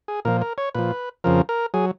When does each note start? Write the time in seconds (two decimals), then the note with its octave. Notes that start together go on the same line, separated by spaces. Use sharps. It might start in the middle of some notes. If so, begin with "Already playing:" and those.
0.08 G#4
0.25 A#2 F3 A#4
0.42 A#4
0.58 C#5
0.75 A#2 F3 B4
1.24 F2 C#3 F3 A#4
1.49 A#4
1.74 F#3 G#4